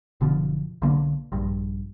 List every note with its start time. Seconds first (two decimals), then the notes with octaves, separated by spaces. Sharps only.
0.21 F#1 B2 D3 F3
0.82 B1 D3 A#3
1.32 A#1 G2